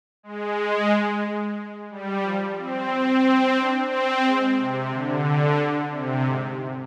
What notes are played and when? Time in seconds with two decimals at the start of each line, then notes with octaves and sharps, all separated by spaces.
0.23 G#3
1.90 G3
2.23 F3
2.57 C4
2.90 C4
3.57 D4
3.90 C4
4.24 G#3
4.57 C3
4.90 D3
5.91 C3
6.23 G#2